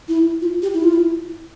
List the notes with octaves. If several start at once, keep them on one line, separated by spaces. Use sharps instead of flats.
E4
F4
G4
E4
F4
E4